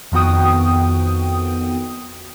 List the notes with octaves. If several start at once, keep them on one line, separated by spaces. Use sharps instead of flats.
F2 D#3 B3 F#4 G5 D#6